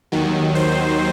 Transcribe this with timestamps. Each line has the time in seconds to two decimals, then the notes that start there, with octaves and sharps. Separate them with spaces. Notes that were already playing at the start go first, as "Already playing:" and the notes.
0.12 D#2 D#3 F#3
0.55 C5